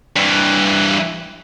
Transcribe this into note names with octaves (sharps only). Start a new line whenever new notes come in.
G2 E3